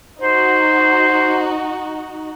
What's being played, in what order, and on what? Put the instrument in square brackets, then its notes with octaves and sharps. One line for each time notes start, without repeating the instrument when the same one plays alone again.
[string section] D#4 F#4 [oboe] C5